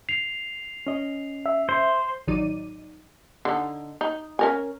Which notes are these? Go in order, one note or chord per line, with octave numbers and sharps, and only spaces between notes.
C7 F7
C#4 D#5
E5
C5
A1 D#3 F#3 D#4 D5 D#7
D3 D#4
D#4
C#4 A#4 G#5